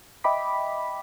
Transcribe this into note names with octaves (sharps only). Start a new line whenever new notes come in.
D#5 E5 G5 B5 D6 B6